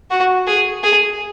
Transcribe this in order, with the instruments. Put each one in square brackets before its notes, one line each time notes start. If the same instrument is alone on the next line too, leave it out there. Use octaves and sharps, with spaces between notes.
[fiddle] F#4
G#4
G#4